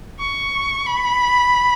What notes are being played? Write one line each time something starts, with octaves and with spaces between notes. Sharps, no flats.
C#6
B5